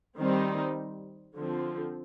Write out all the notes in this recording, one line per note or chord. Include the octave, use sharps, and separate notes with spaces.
D#3 G3 C4 D#4
D3 F3 C4